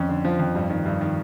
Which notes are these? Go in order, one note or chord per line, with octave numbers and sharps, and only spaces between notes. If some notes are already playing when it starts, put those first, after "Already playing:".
Already playing: F2 C#4
D3
F3
F2
G2
D#3
G2
D#3